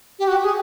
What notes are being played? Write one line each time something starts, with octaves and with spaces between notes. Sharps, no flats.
G4
F#4
G4
G#4